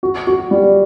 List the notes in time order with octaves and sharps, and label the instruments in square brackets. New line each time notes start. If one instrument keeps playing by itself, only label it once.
[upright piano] F#4
F#4
G3